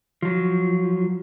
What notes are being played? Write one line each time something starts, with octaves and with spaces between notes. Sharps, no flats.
F3 F#3